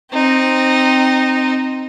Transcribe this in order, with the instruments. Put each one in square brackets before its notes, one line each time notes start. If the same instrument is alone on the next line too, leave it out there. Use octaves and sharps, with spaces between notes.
[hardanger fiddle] C4 D#4